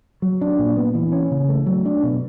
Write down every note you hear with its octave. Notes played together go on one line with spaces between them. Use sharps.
F#3
D4
A#2
B3
E3
C#4
C#3
A3
F#3
D4
B2